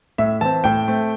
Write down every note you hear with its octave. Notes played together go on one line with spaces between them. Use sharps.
A2 E5
E3 C4 A5
A2 G5
A3 C4